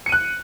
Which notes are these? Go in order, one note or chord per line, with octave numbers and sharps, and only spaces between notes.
F#6 C#7 D#7